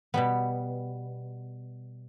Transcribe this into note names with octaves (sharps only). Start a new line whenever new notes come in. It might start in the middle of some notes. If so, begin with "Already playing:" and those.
B2 G3 B3